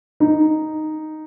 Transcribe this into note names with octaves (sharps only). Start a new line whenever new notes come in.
D#4